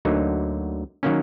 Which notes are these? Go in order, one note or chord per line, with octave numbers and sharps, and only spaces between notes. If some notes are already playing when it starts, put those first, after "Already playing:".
D2 D3 F#3 A#3 D#4
D#3 F#3 A#3 C#4